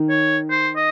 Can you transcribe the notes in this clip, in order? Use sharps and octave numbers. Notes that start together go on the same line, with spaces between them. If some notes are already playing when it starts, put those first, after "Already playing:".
Already playing: D#3
C#5
C5
D#5